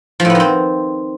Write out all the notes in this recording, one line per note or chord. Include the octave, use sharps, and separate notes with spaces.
F3
A2
B3
D#3
C4